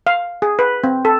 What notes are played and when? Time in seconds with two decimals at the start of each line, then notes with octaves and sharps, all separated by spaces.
0.07 F5
0.42 G#4
0.59 B4
0.84 C4
1.05 A4